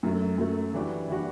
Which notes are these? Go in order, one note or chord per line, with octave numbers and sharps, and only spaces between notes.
F#2 F#3 A3
F#2 F#3 A3
E3 G3 D4 F#4
E3 G3 D4 F#4